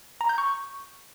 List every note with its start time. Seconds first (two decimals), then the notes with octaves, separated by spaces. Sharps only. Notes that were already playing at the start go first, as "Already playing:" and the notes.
0.21 A#5
0.29 G6
0.38 C#6